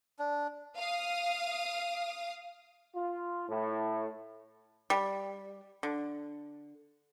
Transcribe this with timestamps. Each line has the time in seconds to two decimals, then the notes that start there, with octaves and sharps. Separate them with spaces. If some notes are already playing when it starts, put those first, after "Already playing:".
0.19 D4
0.77 F5 D#6
2.95 F4
3.49 A2
4.90 G3
5.83 D3